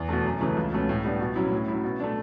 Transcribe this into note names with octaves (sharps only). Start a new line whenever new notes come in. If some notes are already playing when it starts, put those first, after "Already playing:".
Already playing: E2
B2 A3
F#2
C#3 E3 A3
C#2
B2 A3 C#4
A2
G3 B3 D4
B2
F#3 C#4 E4
A2
F#3 C#4 E4
B2
A3 D4